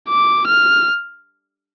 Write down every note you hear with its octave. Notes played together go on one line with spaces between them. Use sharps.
D6
F6